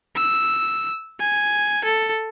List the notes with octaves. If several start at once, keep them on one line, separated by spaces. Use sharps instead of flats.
E6
G#5
A4